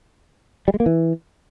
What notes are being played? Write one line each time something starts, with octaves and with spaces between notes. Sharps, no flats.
G3
G#3
A#3
E3